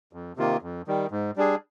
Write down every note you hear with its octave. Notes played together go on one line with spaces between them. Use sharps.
F2
C3 D#3 A#3 F4
F2
D#3 G3
G#2
G3 D4 G#4